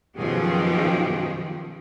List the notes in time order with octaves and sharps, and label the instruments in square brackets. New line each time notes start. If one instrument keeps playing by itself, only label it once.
[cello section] F#2 B2 D#3 F3 G4 G#4